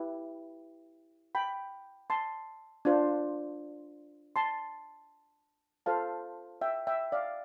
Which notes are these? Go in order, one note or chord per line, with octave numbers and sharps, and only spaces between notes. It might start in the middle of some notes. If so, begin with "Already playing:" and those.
Already playing: E4 G4 B4
G5 B5
A5 C6
D4 F4 C5
A5 C6
F4 A4 C5 F5 A5
E5 G5
E5 G5
D5 F5